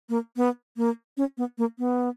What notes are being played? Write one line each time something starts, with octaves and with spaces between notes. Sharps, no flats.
A#3
B3
A#3
C#4
B3
A#3
B3